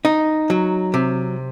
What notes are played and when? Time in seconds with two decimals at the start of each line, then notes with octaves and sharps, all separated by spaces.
0.05 D#4
0.50 F#3
0.94 C3